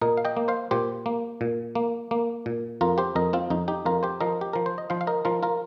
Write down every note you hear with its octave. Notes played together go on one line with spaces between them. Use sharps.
A#2 A#4 D#5
F5
D#5 G5
A#3
C5 F5
A#2 G4 C5
A#3
A#2
A#3
A#3
A#2
F2 F4 A#4
G4 C5
F2 A#4 D#5
C4 F4
F2 D#4
D#4 G4
F2 F4 A#4
G4 C5
F3 A#4 D#5
G4
F3 A#4
C5
D#5
F3 C5 F5
F5
A#4 D#5
F3 F4 A#4
F4 A#4